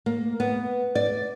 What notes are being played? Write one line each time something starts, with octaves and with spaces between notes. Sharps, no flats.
A#3
B3
D5